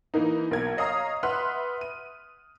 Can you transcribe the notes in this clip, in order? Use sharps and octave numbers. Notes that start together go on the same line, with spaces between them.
E3 A#3 D#4
B1 A#3 A#4 G#6
C#5 D#5 F5 A#5 D#6
B4 E5 F#5 C6 F6 F#6
D#7